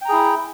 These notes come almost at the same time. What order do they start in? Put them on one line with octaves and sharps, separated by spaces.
G5 A#5 G#4 E4